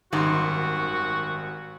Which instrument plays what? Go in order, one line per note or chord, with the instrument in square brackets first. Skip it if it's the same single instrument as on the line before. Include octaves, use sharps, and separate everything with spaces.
[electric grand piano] G#1 C6 [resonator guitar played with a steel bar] F#2 D#3 G3 [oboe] F#4